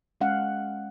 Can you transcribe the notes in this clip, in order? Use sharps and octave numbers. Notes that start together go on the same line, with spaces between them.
G#3 C#4 F5 F#5